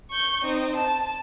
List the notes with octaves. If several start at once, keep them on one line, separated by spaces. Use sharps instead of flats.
C#6 G6
C4 D#4
A5